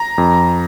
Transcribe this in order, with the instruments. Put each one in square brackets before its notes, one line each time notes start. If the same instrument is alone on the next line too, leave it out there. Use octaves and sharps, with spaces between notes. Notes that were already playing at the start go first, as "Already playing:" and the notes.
Already playing: [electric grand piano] A#5
F2